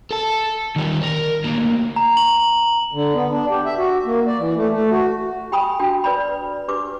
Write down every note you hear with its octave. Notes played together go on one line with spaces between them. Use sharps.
A4 A5
D#3 G3
A#4
D2 A#3
A#5
F#7
D3
B3
D4
G4
E5
F#4
A#3
D5
E3
A3
A3
F#4
G4 G5 G#5 B5 D#6
D4 F#4 G5 A5
B4 D5 B5
D4 G4 B4 D6